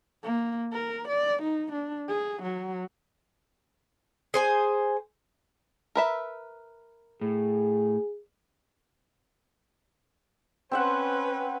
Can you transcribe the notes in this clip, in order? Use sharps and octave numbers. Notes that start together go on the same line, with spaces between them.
A#3
A#4
D5
D#4
D4
G#4
F#3
G#4 C5 G#5
A#4 B4 E5
A2 G#4
C4 C#4 B4 E5 F#5